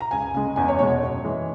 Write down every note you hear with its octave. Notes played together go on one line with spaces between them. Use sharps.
A#5
C#2 G#5
C#3 G#3
E2 G#5
C#5
B2 G#3 C#5
C#5
F#2
E3 G#3